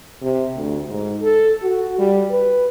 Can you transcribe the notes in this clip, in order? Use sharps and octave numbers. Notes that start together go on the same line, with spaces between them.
C3
D2
G#2
A4
F#4
G3
B4